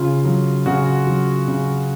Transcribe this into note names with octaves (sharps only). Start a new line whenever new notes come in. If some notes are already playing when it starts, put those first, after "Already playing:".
Already playing: C#3 F4
F#3
C#3 F#4
F#3
C#3